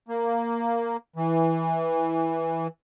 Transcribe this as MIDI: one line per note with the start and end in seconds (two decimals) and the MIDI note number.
0.09 0.97 58
1.16 2.67 52